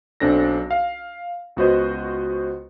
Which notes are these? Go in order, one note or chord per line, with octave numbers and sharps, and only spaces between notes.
B1 C4 D4 A4 A#6
F5
C#2 B3 F#4 B4 C5 D#5